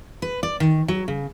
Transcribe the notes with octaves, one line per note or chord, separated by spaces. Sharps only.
B4
D5
D#3
F#3
C#3